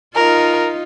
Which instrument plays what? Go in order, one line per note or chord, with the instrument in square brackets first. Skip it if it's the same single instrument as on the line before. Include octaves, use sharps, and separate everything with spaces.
[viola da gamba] D#4 F4 [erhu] A#4